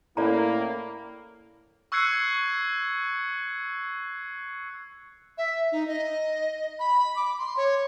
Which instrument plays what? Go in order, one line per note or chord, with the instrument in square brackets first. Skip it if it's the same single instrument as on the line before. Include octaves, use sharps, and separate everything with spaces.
[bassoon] A2 [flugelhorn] A#3 [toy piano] C#4 D5 A#5 [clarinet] E4
[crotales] C#6 E6 F#6 G#6 C7 C#7
[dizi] E5
D#4
D#5
B5
D6
C6
C#5